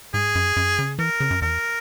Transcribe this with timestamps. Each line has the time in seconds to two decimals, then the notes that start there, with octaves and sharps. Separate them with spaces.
0.14 G#2 G#4
0.35 F#2
0.56 F#2
0.79 C#3
0.99 E3 A#4
1.20 C#3
1.31 F#2
1.42 E2 A#4